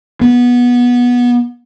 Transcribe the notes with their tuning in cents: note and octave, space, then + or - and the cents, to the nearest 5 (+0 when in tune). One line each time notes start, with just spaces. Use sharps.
B3 -15